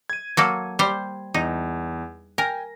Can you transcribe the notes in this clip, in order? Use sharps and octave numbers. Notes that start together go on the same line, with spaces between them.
G#6 D#7
F#3 A#3 A4
G3 C5
E2 D#4
A#4 G5 G#5 A#6